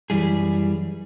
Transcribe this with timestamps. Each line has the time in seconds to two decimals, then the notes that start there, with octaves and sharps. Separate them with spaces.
0.10 F#2 E3 G3 G#4